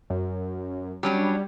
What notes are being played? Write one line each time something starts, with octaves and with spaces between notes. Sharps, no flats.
F#2
F#3 G3 C#4 D4